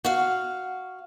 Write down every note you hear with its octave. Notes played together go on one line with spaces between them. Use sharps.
F#4 F5